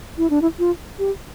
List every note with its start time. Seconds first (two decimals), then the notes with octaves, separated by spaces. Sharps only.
0.18 E4
0.30 D4
0.42 E4
0.59 F4
0.99 G4